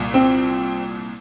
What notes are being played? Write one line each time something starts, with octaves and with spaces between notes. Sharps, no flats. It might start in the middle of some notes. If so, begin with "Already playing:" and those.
Already playing: C2 A#2
C4